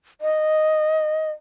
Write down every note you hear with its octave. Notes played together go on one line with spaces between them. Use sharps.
D#5